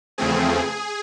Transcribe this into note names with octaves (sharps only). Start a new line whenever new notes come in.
E2 C#3 F3 A3 C4 G#4